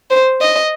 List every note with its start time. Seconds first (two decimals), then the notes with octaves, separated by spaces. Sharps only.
0.10 C5
0.42 D#5